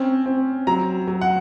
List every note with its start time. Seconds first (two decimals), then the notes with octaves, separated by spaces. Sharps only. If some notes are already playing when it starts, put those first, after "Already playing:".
Already playing: C4 C#4
0.26 C4
0.67 F#3 A#5
1.08 F#3
1.21 F#5